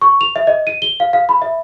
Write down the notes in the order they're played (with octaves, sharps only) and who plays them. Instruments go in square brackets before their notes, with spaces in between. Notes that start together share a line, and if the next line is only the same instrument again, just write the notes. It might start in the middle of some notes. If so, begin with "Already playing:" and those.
[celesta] C#6
F7
E5
D#5
D#7
G7
F5
F5
B5
E5